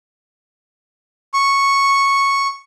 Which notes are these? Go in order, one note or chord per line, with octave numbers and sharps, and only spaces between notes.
C#6